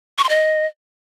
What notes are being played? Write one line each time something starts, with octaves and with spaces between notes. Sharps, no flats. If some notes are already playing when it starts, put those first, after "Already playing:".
C#6
C6
D#5